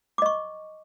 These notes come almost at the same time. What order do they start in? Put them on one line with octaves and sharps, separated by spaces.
D6 D#5 C#6